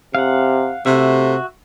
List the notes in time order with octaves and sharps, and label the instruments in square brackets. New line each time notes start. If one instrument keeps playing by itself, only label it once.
[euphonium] C3 [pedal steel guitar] F5 F#5
[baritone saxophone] C3 [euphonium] A3 [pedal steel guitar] F#4 E5